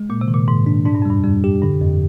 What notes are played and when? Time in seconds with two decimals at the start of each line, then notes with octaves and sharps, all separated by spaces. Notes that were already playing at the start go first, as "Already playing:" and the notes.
Already playing: G#3
0.10 A#2 A#3
0.21 C3
0.28 D#3
0.34 A#2
0.48 G#2 D#3
0.66 D4
0.85 G#2 D4
0.95 G2
1.02 F2
1.05 G2 G3
1.24 F2 G3
1.44 G4
1.62 G2 D3
1.81 F2